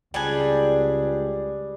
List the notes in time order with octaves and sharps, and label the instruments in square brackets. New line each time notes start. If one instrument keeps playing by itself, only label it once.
[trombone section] C#2 [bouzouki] G3 D4 G#4